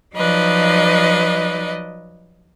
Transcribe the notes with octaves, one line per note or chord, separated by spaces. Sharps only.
F3 F#3 D#4 B4 D5 D#5